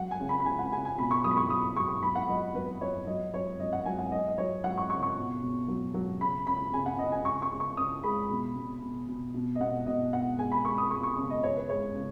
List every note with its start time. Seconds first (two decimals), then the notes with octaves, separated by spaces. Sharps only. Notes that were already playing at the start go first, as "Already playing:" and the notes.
Already playing: F#3 F#5
0.11 G#5
0.20 C#3
0.29 B5
0.40 B5
0.46 C#3 G#5
0.59 F#5
0.72 C#3 G#5
0.85 G#5
0.98 B2 B5
1.11 C#6
1.24 F#3 D#6
1.31 B5
1.37 C#6
1.50 F#3 D#6
1.76 F#3 C#6
2.03 F#3 B5
2.15 F#5
2.28 F#3 D#5
2.55 F#3 B4
2.81 F#3 C#5
3.07 F#3 D#5
3.34 F#3 C#5
3.59 F#3 D#5
3.73 F#5
3.86 F#3 G#5
3.99 F#5
4.12 F#3 D#5
4.27 D#5
4.38 F#3 C#5
4.64 F#3 F#5
4.78 C#6
4.90 C#3 C#6
5.03 C#6
5.16 B2
5.42 B2
5.68 F#3
5.94 F#3
6.21 C#3 B5
6.47 C#3 B5
6.73 C#3 G#5
6.86 F#5
6.99 C#3 D#5
7.12 G#5
7.25 C#3 C#6
7.42 C#6
7.52 C#3
7.60 C#6
7.77 C#3 D#6
8.03 G#3 B5
8.30 B2
8.55 B2
8.82 B2
9.08 B2
9.34 B2
9.55 D#5
9.60 B2 F#5
9.86 B2 D#5
10.13 B2 F#5
10.38 G#3 G#5
10.52 B5
10.65 G#3 C#6
10.78 D#6
10.91 G#3 C#6
11.03 C#6
11.17 C#3
11.30 D#5
11.43 C#3 C#5
11.57 B4
11.69 G#3 C#5
11.95 C#3